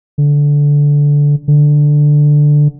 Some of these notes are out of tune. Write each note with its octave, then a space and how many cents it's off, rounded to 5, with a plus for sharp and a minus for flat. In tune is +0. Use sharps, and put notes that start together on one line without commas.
D3 -15
D3 +5